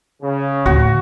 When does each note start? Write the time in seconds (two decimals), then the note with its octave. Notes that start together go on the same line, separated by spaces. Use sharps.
0.22 C#3
0.66 D2 A2 F#4